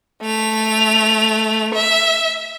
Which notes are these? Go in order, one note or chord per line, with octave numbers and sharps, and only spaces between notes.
A3 F7
E5